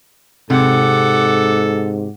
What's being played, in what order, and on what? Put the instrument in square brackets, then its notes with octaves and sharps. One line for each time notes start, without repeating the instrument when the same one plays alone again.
[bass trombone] G#2 [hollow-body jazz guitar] C3 [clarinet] A4 [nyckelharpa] F#5 D6